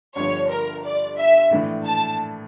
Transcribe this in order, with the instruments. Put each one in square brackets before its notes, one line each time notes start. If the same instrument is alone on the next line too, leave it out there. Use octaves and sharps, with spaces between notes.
[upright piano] G1 G2 D3 F3 [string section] C#5
[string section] A#4
D5
E5
[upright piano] A#1 A2 E3
[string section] A5